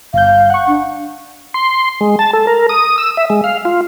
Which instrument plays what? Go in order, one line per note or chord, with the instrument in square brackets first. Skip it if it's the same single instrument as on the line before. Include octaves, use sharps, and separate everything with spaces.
[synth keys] G1 G6 [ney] F5
[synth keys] F#5 C#6
[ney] D4
[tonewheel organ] C6
G#3
A5
A4
A#4
D#6
E6
E5
G#3
F5
F4